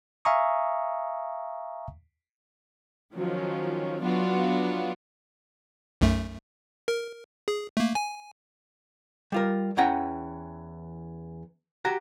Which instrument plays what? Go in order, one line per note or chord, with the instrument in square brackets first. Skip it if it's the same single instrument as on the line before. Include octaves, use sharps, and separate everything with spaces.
[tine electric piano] E5 F5 G#5 A#5 C#6 D#6
[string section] D#3 F3 F#3 C#4
F#3 B3 D4 F4 F#4
[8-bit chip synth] B1 F#2 A3
A#4
G#4
A3 A#3
G#5
[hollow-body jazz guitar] G3 F4 A#4
E2 E3 C#4 F#5 G5 A#5
F#4 G4 A#5